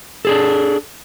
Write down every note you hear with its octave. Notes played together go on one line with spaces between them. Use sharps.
D4 G#4 A4